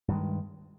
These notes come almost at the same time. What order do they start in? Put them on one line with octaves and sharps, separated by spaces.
G2 D#3 G#3